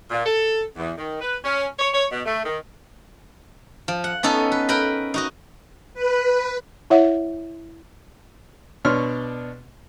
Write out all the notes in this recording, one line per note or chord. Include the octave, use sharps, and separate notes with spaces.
A#2
A4
E2
D#3
B4
C#4
C#5
C#5
B2
A3
D#3
F3
F#5
B3 C#4 D#4 A4
B4
A#4 B4 G5 A#5 B5
D#4 F#4 D#5
B4
E4 C#5 E5 F#5
B2 D4 C#5 C6 F6